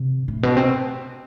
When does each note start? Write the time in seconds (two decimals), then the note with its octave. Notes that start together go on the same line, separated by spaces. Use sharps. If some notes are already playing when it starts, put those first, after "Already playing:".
Already playing: C3
0.28 A2
0.43 B2
0.57 C3